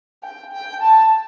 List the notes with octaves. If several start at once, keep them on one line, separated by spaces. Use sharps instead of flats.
G5
G5
A5